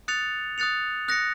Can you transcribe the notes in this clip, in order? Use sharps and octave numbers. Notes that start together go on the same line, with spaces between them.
D#6 F#6 A6 C#7 F7
D#6 F#6 A6 C#7 F7
D#6 F#6 A#6 C#7